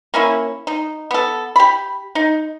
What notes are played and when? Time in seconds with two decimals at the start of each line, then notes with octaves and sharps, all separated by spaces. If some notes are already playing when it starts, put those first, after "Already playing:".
0.14 A#3 C#4 E4
0.67 D#4
1.11 B3 A4
1.56 G4 B5
2.15 D#4